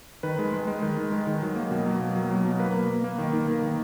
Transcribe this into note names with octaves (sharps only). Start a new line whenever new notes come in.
D#3 B4
G#3
G#3
G#3
D#3
G#3
G#3
D#3
F#3
A#3
B2
F#3
A#3
F#3
F#3
B2
A#3 B4
A#3
A#3
A#3
D#3
D#3
A#3
D#3